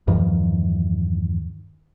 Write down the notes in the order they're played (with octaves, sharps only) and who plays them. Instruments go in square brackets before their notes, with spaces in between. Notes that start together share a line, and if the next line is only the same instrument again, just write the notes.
[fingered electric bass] E2 G2 D#3 F3